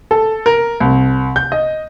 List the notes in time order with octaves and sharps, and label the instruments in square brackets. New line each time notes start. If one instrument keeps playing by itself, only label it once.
[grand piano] A4
A#4
C2
G6
D#5